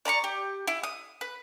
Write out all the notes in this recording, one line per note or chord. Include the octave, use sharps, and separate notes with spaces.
D5 A#5 B5 C#6
G4
E4
D#6
B4